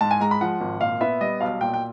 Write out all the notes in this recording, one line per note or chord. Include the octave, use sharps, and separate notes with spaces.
G#2 A5
G#5
G#3 A#5
B5
F3 F#5
G#1
A#2 F5
B3 E5
G3 D#5
B1 F5
A#2 G5
G5